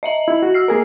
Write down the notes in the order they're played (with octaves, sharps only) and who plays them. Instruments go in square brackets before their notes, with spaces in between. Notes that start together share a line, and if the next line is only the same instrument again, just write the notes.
[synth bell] D#5 E5 F#7
[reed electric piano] E4
F#4
[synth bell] E6 F6 C7
[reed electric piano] A#3 G#4 A#4